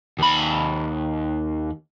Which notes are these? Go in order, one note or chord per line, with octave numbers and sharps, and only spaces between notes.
D#2 B5